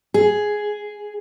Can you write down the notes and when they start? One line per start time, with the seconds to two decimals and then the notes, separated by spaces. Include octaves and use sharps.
0.14 G#4